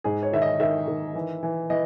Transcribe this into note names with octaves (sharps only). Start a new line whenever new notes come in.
G#2 G#4
C#5
D#3 E5
D#5
D#3 E5
D#3
E3
E3
E3 D#5